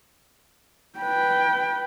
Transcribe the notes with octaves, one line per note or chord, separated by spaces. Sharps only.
B4 G5